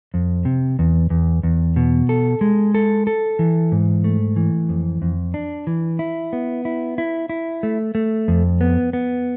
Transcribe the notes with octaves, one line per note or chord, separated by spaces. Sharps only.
F2
C3
E2
E2
E2
B2
A4
G#3
A4
A4
E3
G#2
A3
E3
F2
F2
D4
E3
E4
B3
E4
E4
E4
A3
A3
F2
B3
B3